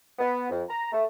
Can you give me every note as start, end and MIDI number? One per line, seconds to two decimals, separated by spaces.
0.19 0.46 59
0.50 0.63 41
0.68 0.89 82
0.92 1.04 57